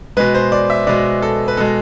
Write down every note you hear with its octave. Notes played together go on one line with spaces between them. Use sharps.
B2 G#3 B4
C5
D5
E5
B2 G#3 D5
A4
B4
B2 G#3 A4